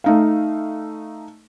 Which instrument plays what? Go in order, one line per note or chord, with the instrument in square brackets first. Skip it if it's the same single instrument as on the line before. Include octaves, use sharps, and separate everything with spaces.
[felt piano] A3 D#4 F5